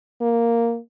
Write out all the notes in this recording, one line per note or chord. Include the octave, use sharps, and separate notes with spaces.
A#3